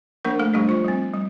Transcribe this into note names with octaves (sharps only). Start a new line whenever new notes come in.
F3 A#3 D4 A#4
A3 A4
F3 G3 A3 D4 G4
F3 F4
G3 C4
G3